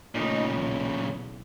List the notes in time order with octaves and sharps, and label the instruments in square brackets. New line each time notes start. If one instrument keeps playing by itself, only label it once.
[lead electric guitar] A#2 C#3 [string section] A3 D#4
[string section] B1 E2